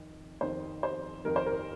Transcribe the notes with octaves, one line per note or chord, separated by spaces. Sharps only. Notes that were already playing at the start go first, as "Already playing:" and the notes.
Already playing: F2 D#3
F2 D#3 C5
C5
F2 D#3 A#4
C5
A#4